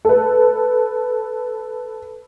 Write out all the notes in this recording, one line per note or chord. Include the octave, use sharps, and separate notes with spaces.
A4 B4